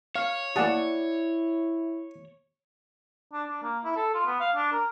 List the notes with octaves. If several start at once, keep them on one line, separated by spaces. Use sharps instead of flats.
C#5 F5
A#3 E4 G#4 D5 F#5 A5
D4
D4
A#3
E4
A4
F4
B3
F5
D4
A#4